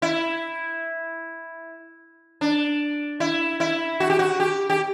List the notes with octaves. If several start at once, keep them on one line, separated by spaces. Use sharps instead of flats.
E4
D4
E4
E4
F#4
G4
F#4
G4
G4